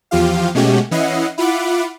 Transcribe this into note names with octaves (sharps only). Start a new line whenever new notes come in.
E2 F3 F4 G4 F5
B2 G#3 A3 C#4 F#4 G4
E3 C#4 E4 D#5 F#5 C7
E4 F4 F#5 B5 D6